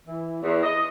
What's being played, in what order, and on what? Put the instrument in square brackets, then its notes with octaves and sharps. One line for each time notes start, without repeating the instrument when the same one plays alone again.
[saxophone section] E3
E2
D#5